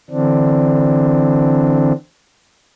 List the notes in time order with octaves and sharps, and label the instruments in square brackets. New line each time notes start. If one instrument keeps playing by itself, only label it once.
[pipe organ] D3 E3 C4 D4